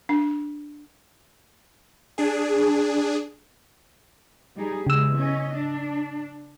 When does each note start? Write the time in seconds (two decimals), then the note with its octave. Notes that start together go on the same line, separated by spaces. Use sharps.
0.09 D4
2.18 D4 G#4
4.56 G3 D#4 G#4
4.87 E2 C#3 G#3 E6
5.17 C#4 D#5
5.54 D4